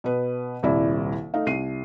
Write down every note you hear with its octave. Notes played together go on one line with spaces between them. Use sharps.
B2 B4
D#1 C2 E4 D5
A3 D#4 F5
C2 C7 D#7